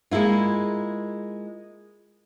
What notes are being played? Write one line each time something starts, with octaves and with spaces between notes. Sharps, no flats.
G#3 A#3 E4 F4